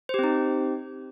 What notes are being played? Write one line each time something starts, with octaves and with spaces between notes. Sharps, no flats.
C4 D#4 G4 C5